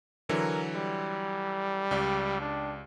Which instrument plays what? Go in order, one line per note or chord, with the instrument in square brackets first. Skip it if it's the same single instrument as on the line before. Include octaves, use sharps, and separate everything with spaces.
[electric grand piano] D3 E3 F#3 [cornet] A#4
[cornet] G3
[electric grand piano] C#2 G4 D5
[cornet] D4